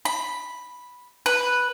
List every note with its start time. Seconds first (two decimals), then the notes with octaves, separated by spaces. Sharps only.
0.05 B5
1.26 B4